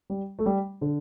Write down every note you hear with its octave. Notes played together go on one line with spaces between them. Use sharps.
G3
A3
G3
D3